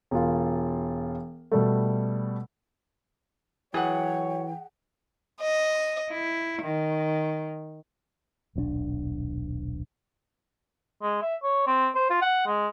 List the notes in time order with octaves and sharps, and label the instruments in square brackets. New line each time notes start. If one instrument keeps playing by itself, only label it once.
[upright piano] E1 F4
B2 G3 A3
[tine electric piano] E3 [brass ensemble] F#3 C#5 [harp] G#4 F#5 [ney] G5
[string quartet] D#5
E4
D#3
[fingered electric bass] D#1 B1 C4 D4
[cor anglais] G#3
E5
C#5
C4
C5
F4
F#5
G#3